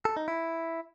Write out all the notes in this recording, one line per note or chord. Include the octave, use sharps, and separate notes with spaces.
A4
D#4
E4